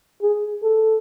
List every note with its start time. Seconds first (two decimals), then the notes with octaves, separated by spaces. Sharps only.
0.23 G#4
0.63 A4